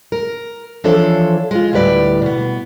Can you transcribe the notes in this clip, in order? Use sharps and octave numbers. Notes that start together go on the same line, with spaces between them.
A#4
E3 F3 D4 A4 C5 C#5
G#3 F4
D2 A2 G3 B4 D5
B2 B3